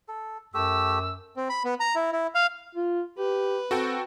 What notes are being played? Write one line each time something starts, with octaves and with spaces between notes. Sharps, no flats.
A4
F#2 A3 G4 E6
C4
B5
B3
A#5
E4
E4
F5
F4
G4 B4
C4 F#4 A4 G5